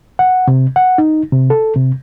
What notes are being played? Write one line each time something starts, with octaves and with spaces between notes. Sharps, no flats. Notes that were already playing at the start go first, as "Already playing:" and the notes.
F#5
C3
F#5
D#4
C3
A4
C3